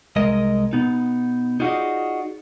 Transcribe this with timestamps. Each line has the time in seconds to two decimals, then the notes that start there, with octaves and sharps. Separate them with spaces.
0.16 C2 G#3 A#4 D#5
0.73 B2 B3 D#4
1.60 D#4 F4 F#4 G#4 D5 D#5